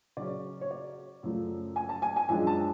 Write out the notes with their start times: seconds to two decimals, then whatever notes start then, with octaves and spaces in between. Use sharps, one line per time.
0.17 C#3 F#3 C#4 D5
0.61 C#5
0.71 D5
1.23 F#2 C#3 F3 A3
1.76 G#5
1.89 A5
2.02 G#5
2.16 G#5
2.29 F#2 F3 G#3 D4 G#5
2.47 A5